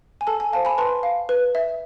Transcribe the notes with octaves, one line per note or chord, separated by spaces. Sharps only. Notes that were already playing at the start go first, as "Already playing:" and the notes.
G#5
A4 A5
G#5
C5 F5 A5
G#5 B5
B4 A5 C6
F5
B4
E5